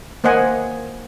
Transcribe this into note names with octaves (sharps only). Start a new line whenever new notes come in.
A#3 C5 D#5 F#5 G#5